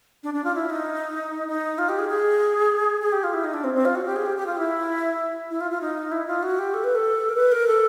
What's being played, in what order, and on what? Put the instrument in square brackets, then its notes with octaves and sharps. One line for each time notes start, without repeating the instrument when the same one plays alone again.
[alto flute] D4
D4
F4
E4
D#4
D#4
F4
G4
G#4
G#4
G#4
G4
F4
E4
D#4
D4
C4
C4
F4
F#4
G4
G#4
G4
G4
F4
E4
E4
F4
F4
D#4
E4
F4
F#4
G4
A4
B4
A4
A#4
B4
A#4
A4